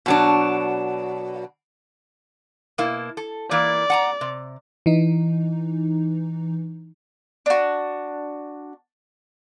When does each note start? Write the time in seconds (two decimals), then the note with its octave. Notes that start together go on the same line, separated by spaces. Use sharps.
0.06 B2 F#3 D4
2.78 B2 A#3 E4
3.17 A4
3.51 E3 A#3 E4 D5
3.90 F#5 A5 A#5
4.21 C3
4.86 E3 D#4
7.46 D4 F#4